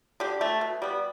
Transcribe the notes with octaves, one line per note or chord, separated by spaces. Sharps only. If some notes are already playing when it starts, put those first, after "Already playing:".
D3 G4
A3
B2
G3 B3